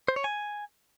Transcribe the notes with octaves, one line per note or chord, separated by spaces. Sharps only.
C5
C#5
G#5